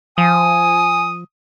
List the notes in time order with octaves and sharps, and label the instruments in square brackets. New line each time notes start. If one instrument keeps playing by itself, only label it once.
[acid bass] F3 [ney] G#5 [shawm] D#6